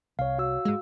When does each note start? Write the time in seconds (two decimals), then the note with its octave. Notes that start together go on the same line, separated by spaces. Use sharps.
0.19 C2 C#5 F5
0.38 F#4 F5 E6
0.65 G#2 G#3